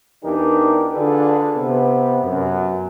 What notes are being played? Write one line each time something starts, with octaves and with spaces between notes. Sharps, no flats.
E2 E3 D4 D#4 G4 A#4
D3 D4 F4 G#4 A4 B4
C3 B3
F#2